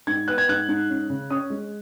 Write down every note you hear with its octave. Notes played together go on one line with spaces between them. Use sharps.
G#2 G#6
B3 F#6
G#6
G#2 F#6
G#2
C#4
C#3
C#4 D#6
G#3